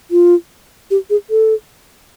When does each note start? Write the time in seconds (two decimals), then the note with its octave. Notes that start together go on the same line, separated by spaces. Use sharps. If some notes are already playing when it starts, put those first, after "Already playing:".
0.11 F4
0.91 G4
1.10 G#4
1.30 A4